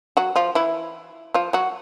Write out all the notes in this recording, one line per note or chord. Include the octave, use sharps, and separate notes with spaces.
F#3 F#4
F3 F4
E3 E4
F3 F4
F#3 F#4